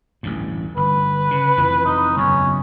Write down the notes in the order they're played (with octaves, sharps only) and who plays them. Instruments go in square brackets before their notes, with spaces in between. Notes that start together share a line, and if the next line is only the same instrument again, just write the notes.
[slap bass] A1 D2 G2
[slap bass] G1 [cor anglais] B4
[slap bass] C#3
F1 F2 E3
[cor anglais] D#4
[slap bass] F#1 B1 E2 [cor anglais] C#4